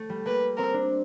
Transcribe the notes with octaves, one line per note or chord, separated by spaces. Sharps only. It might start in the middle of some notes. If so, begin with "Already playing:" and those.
Already playing: A3
G3
A#3 B4
C4 A#4
D4